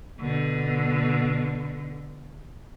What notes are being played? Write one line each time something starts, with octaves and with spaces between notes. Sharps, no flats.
B2 D3